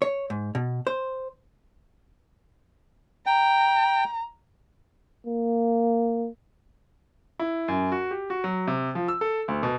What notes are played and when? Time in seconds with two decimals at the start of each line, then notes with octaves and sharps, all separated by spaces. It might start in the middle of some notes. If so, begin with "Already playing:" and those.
0.02 C#5
0.30 G#2
0.55 B2
0.87 C5
3.26 G5 A#5
5.27 A#3
7.39 E4
7.68 F#2
7.92 F#4
8.11 G4
8.30 F#4
8.44 F#3
8.67 C3
8.95 F3
9.08 E6
9.21 A4
9.48 D2
9.63 B2